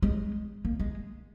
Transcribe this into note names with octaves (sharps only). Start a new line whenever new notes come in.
G#3
A#3
G#3